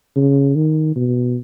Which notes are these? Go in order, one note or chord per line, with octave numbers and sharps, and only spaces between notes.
C#3
D#3
B2